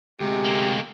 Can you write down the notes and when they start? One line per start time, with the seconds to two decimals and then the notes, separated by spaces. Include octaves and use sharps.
0.20 D2 C3 G#3 G4
0.44 A3 A#3